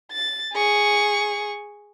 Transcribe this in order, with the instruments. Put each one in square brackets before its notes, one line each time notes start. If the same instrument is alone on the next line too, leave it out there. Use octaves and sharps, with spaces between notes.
[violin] A6
G#4 C#6